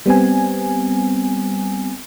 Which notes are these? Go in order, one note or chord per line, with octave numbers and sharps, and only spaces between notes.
G3 B3 C4 G#5